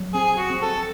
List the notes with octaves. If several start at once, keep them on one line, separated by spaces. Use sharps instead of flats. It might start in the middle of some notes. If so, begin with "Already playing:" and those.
Already playing: F#3
C4 G#4
F#4
C4
A4